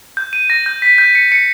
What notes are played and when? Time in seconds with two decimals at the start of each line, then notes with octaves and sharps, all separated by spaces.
0.17 G6
0.33 D#7
0.50 A#6
0.66 G6
0.82 B6
0.98 G6
1.15 C#7
1.32 C#7